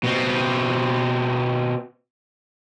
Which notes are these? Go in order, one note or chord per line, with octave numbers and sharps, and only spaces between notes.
B2 C4